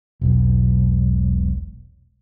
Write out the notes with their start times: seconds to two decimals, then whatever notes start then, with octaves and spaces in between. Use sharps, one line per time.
0.21 E1 B1